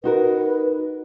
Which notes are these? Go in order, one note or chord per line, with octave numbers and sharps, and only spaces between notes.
D#4 F#4 A#4 B4